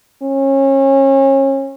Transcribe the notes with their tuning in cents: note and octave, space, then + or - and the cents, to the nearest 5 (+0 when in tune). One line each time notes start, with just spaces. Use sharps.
C#4 -30